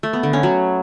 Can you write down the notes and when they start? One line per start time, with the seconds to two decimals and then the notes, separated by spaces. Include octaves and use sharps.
0.03 A3
0.13 B3
0.23 D3
0.33 C#4
0.43 F#3